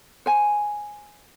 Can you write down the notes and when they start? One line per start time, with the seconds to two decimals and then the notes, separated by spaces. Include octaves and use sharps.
0.26 C5 G#5